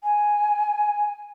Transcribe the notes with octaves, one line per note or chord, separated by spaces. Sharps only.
G#5